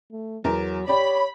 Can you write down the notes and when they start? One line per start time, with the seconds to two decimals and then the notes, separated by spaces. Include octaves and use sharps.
0.12 A3
0.44 E2 F#3 A#4
0.88 G4 C#5 D5 B5